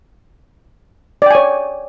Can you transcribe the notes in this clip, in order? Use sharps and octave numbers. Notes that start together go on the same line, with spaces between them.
C#5 D5 G5 G#5